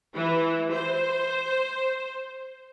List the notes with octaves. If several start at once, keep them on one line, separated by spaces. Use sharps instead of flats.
E3
C5